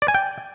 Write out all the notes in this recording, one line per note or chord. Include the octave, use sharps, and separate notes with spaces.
D5
G#5
G5